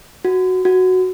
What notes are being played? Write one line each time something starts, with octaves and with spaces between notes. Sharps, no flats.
F#4
F#4